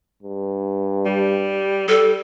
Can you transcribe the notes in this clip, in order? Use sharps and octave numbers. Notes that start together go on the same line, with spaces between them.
G2
G3
G3 A4